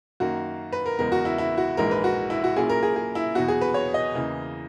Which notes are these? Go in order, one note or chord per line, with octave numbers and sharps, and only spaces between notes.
F#2 D#3 A#3 F#4
B4
A#4
F#1 E2 C#3 G#3 B3 A#4
F#4
E4
E4
F#4
A#1 G#2 E3 G#3 A#4
B4
F#4
E4
F#4
A#2 F#3 C#4 E4 G#4
A#4
G#4
G#4
E4
E2 B2 F#3 B3 F#4
G#4
B4
C#5
D#5
E2 C#3 E3 A#3